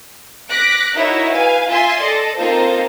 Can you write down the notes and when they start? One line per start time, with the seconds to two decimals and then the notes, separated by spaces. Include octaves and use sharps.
0.50 D6 F#6 A#6 B6 D7
0.96 D#4 E4 F#4 A#4 C#5 E5
1.33 B4 F5 G#5
1.69 F4 E5 G#5 C6
2.02 A4 D5 D#5
2.38 A#3 C4 D#4 F4 A4 C5